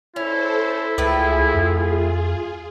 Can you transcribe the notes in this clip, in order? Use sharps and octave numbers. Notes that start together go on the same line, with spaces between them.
C#4 E4 A4 C5
C#2 A2 A3 F4 G#4 B4
F2